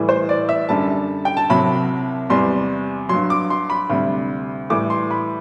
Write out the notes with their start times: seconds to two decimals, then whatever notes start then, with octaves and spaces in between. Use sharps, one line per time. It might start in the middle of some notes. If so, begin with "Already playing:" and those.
Already playing: A2 E3 G3
0.09 C5
0.29 D5
0.49 E5
0.69 F#2 D3 G3 A5
1.25 G5
1.37 A5
1.50 C2 C3 F#3 B5
2.29 E2 C3 G3 C6
3.09 G2 F#3 C6
3.30 D6
3.50 C6
3.70 B5
3.90 D2 C3 G3
4.70 A2 E3 G3 D6
4.90 C6
5.11 B5